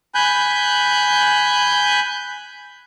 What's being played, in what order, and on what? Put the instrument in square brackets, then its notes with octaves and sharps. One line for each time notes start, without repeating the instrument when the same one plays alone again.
[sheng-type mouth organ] G#5 B5 F#6 G6